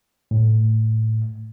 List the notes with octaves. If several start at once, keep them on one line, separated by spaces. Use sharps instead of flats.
A2